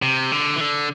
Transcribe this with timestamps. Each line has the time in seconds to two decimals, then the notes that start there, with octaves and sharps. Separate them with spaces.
0.02 C3
0.32 D3
0.56 E3
0.61 D3